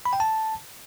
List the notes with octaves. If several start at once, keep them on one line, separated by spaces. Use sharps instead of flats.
B5
G5
A5